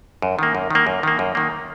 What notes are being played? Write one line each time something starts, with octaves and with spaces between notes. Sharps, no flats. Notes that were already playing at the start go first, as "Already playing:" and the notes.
F#2
D#3 A#3
F#2
D#3 A#3
F#2
D#3 A#3
F#2
D#3 A#3